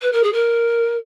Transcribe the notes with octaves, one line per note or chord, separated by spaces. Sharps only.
B4
A#4
G#4
A#4